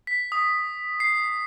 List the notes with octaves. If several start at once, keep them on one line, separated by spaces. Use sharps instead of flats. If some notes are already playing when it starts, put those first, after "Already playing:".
B6
D#6
C7